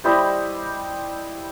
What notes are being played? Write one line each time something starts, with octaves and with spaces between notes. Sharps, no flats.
G3 E4 C5 D#5